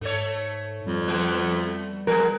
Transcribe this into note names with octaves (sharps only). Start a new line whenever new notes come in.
G#2 A3 A4 C#5
F2 G3
F3 A3 B3
F3 B3 G#4 A#4